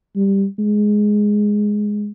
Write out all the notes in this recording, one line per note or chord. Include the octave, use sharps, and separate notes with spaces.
G3
G#3